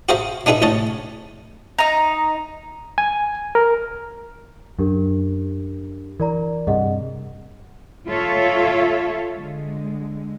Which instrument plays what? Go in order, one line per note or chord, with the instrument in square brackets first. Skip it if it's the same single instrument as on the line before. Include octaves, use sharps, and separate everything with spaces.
[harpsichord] F#4 G#4 C5 E5 F5 A#5
D4 D#4 G#4 B4 E5
A1 D2 C#5 D#5 A5
[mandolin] D#4 A#5
[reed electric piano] G#5
A#4
[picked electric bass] F#2 [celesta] D4 G4 A#4
[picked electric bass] E3 [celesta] A#4 D5 A#5
[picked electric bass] G2 C3 [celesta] G#4 D#5 F#5
[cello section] F4 A4 C#5 E5 F5
D3 G#3